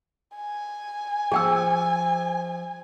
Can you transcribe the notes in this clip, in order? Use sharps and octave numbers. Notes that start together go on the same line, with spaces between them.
G#5
F3 G#4 G5 E6